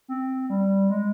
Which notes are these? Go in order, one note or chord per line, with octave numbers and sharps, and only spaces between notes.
C4
G3
G#3